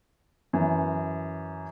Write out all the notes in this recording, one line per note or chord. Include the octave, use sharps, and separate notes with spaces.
F#2 E3